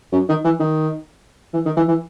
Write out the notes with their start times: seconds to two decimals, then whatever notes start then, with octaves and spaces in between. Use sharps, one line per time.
0.12 F#2
0.29 D#3
0.44 E3
0.60 D#3
1.53 E3
1.66 D#3
1.77 E3
1.88 E3